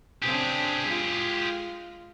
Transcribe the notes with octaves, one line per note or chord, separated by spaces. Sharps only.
C#3 C4 D4 G4 G#4
G#3 F4